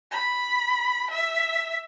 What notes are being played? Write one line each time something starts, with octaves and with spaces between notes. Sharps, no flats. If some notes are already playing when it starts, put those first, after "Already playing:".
B5
E5